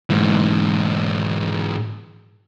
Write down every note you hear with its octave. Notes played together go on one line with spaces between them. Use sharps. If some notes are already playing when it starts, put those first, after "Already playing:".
G#2 E3